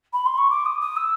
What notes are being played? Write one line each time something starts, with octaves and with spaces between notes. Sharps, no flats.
B5
C6
C#6
D6
D#6
D#6
E6